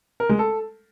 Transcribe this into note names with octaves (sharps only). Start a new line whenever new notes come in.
A#4
G#3
A4